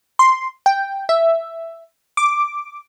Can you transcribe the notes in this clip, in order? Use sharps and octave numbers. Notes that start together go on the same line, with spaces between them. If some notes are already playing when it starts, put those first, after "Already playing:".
C6
G5
E5
D6